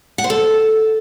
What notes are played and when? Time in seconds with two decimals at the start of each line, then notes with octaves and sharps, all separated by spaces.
0.18 F#5
0.24 C5
0.30 A4